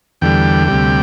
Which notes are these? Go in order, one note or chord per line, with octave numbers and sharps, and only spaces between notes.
E2 D3 G3 G5
D2 C3 G3